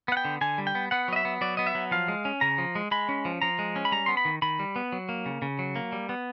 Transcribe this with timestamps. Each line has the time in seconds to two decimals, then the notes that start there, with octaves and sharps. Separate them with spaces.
0.08 B3 F#5
0.17 G5
0.25 D3
0.41 D3 G#5
0.58 G3
0.67 G5
0.75 B3
0.91 B3 F#5
1.08 F#3 D#5
1.16 E5
1.25 B3
1.41 F#3 D5
1.57 B3 D#5
1.67 E5
1.75 F#3
1.91 F3 F5
2.08 G#3
2.25 C#4
2.41 C#3 A#5
2.58 F3
2.75 G#3
2.91 G#3 B5
3.09 C#4
3.25 F3
3.42 F3 A#5
3.59 G#3
3.76 C#4
3.85 B5
3.92 G3 A#5
4.06 B3 C6
4.17 B5
4.25 D#3
4.42 D#3 B5
4.59 G3
4.76 B3
4.92 F#3
5.09 A#3
5.26 C#3
5.42 C#3
5.59 F#3
5.76 A#3
5.92 G3
6.09 B3